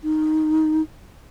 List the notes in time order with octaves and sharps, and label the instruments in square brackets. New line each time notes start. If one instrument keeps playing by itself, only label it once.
[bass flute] D#4